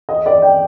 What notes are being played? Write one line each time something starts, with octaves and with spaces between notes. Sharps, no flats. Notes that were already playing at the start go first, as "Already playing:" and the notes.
D#5
D5
G5